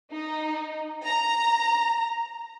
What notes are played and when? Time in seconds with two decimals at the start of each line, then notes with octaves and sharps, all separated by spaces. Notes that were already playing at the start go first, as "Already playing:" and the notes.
0.12 D#4
1.05 A#5